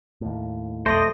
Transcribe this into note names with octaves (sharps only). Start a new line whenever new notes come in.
D#2 A2
B1 F2 A3 C5 D5 D#5 A#6